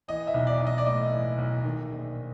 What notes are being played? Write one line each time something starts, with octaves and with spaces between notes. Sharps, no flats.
E3 D#5
E5
B1
D5
B1
D#5
D5
A2 D#5
E3
B1
D#3
A#1